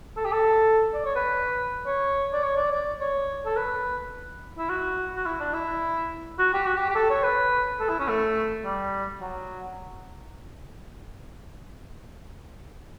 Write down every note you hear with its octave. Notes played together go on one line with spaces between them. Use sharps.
A4
G4
A4
D5
C#5
B4
C#5
D5
C#5
D5
D5
C#5
A4
B4
E4
F#4
F#4
E4
D4
E4
F#4
G4
F#4
G4
G4
A4
C#5
B4
A4
E4
C#4
A3
G3
F#3